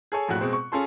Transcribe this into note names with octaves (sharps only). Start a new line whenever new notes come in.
G#4 A4 C#5 G#5
A#1 F2 A2 F#4 F#6
B2 G#3 C4
C#6
C#4 F4 G#4 A4 C6